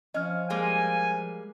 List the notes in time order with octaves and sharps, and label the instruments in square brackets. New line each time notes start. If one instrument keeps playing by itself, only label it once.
[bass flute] F3 [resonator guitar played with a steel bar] C#4 [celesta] D#5 F6
[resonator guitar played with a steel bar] G3 G#3 A#3 [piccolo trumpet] G#5